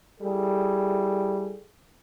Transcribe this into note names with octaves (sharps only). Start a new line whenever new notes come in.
G3 E4 G#4 A4